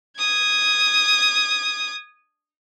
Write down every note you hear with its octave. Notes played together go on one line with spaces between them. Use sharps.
D#6 G#6